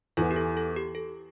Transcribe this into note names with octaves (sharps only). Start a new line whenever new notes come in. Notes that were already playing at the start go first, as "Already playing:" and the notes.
E2 E3 B3 A4
G4
A4
A4
G4
A4